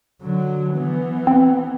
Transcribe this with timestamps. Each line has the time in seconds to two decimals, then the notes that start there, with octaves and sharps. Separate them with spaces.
0.22 D3 F#3
0.74 E3 B3
1.27 C4